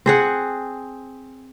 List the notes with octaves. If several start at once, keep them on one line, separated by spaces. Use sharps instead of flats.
C4 G#4 F#5